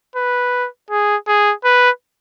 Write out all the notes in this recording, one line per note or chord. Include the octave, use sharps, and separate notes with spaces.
B4
G#4
G#4
B4